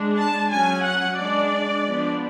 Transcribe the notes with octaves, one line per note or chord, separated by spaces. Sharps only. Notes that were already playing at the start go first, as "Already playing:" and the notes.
Already playing: G#3 D4
A5
F#3 C#4 G#5
F#5
G#3 D4 D5
F3 B3 D4